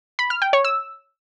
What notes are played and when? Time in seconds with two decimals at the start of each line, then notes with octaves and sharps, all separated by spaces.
0.19 B5
0.30 F6
0.42 G5
0.53 C#5
0.64 E6